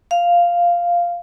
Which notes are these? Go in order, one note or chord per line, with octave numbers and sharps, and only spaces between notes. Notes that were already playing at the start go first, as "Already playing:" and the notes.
F5